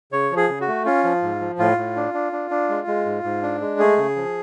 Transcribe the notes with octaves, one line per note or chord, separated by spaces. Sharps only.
C#3 C#5
F3
G#4
C#3
F#4
A3
C#4 F4
F3
G#2
F3
A2 F4
A2
D4
D4
D4
D4
G#3
G#3
G#2
G#2
D4
G#3
A3 G#4
C#3
F3